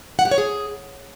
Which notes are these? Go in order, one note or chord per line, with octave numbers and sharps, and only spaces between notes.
F#5
G4
C#5
G#4